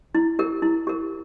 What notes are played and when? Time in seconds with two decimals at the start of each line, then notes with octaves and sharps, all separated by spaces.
0.15 E4
0.39 G4 A#4
0.62 E4
0.87 G4 A#4